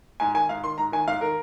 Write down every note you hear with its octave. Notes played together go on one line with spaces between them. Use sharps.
G#2 G#5
D#3 G#5
G#2 F5
D#3 C6
G#2 A#5
D#3 G#5
G#2 F5
D#3 A#4